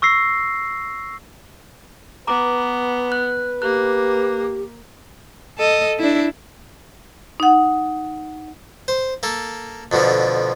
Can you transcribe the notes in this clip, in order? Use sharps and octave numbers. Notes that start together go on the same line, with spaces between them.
C#6 E6 A#6 C7
B3 B4 A#5 D6
F#6
A#3 G4 F#6
A4 D#5
D4 E4
D#4 F#5
C5
A#3 A4
F2 B2 D3 F3